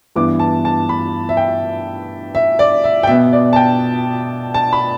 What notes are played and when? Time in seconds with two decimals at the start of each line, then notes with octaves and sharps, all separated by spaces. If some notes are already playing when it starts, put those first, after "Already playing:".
0.16 G2 E3 B3 D6
0.39 A5
0.65 A5
0.89 B5
1.29 E5
1.37 G5
2.35 E5
2.59 D5
2.84 E5
3.03 G5
3.07 B2 B3 E5
3.33 D5
3.53 A5
3.56 G5
4.54 A5
4.73 B5